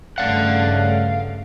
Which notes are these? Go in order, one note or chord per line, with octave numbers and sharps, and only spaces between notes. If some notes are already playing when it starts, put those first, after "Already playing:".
G2 C#3 A3 D5 F5 F#5